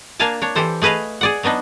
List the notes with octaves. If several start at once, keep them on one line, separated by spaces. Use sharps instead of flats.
A#3 D4 F5 G#5 A5
D4 C#5
E3 G4 A4 C5
A3 G#4 B4 D#5 F5
G#4 D5 F#5
F#3 B3 D4 D#4